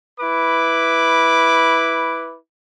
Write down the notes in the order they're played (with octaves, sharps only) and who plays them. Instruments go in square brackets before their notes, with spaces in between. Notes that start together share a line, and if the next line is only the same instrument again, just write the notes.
[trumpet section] E4 B4 D6